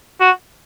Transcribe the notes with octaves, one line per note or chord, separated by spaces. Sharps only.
F#4